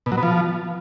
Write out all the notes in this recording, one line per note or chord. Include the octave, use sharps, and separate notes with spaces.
B2
F#3
B3
F3